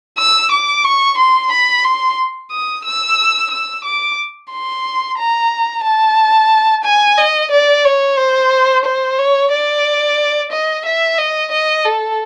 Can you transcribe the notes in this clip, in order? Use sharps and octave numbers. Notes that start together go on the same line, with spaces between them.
E6
D6
C#6
C6
B5
C6
D#6
E6
E6
D6
C6
A#5
A5
G#5
D#5
D5
C#5
C5
C5
C#5
D5
D#5
E5
D#5
D#5
A4